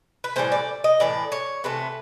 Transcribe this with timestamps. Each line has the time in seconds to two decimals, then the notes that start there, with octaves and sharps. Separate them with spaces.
0.24 B4
0.36 A2 E3 G3 C5
0.52 D5
0.84 D#5
1.00 A2 E3 D5
1.32 C#5
1.64 C3 E3 A3 B4